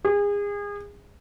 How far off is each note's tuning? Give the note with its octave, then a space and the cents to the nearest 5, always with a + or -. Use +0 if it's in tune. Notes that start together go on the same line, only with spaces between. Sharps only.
G#4 -30